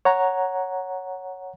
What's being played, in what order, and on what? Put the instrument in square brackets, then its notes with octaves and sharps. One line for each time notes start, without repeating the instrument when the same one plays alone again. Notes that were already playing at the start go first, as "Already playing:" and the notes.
[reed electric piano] C#5 F#5 A#5